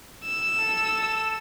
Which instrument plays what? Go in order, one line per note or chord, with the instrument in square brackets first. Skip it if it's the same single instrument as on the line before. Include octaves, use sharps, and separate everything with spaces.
[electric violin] E6
[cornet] A4